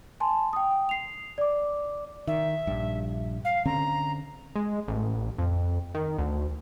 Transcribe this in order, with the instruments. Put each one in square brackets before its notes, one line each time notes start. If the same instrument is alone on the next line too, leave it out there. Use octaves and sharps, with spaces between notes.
[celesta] G#5 A5 C6
G5 D#6
C7 F7
D5 D6
[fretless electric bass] D#3 [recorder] E5
[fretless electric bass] A#1 G2
[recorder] F5
[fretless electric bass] D3 C4 C#4 [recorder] A#5
[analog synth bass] G#3
A1
F2
D#3
D2